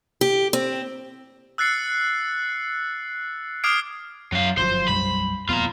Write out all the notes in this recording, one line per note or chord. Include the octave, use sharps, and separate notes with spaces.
G4
C4
E6 F#6 A6 C7 C#7
D6 D#6 F6 G#6 C7 D7
F#2 F#3 F5
G1 F3 F#3 C5
B1 F#2 G3 B5
D#1 F2 B3 F4 A#5